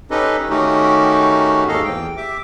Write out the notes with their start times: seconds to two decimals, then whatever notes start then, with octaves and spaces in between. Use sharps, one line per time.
0.11 C#4 D#4 G4 A4 B4 D#5
0.50 D#3 A3 C#4 D#4 F#4 G4
1.68 D#2 G#2 A4 D#5 F5
1.84 E2 E3 G5
2.17 G4 E5 D6